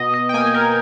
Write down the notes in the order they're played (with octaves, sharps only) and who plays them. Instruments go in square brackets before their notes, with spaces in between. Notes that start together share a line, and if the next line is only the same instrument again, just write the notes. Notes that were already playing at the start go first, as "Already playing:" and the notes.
Already playing: [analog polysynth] B2 D#5
D#5
G5
A#3 G#5
A#4